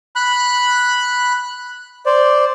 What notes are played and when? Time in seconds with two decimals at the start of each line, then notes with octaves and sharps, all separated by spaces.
0.16 B5 F#6
2.06 C5 D5